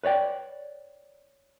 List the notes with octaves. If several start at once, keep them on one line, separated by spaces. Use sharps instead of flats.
B4 C#5 D5 G5